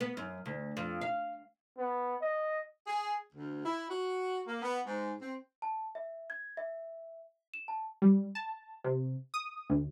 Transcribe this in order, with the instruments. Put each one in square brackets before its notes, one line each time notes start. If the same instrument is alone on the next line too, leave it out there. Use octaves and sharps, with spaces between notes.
[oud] B3
F#2
D2
F2
F5
[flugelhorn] B3
D#5
[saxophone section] G#4
D2
E4
F#4
A#3
B3
G#2
C4
[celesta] A5
E5
G#6
E5
E7
A5
[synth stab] G3
A5
C3
D#6
D2